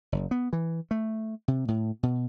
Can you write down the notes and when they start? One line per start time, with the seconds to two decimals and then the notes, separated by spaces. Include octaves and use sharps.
0.12 F#1
0.31 B3
0.53 E3
0.91 A3
1.48 C3
1.68 A2
2.03 B2